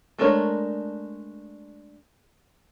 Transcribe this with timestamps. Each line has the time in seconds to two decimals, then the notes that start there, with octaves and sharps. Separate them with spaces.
0.18 G#3 A3 D4 A#4 C#5